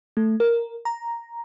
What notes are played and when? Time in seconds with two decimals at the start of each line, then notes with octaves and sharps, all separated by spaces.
0.17 A3
0.40 A#4
0.85 A#5